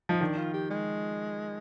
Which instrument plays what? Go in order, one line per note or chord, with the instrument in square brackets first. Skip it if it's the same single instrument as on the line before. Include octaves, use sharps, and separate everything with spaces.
[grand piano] F3 [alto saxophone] D#4
[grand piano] D#3 [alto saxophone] D4
[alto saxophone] F4
G4
G#3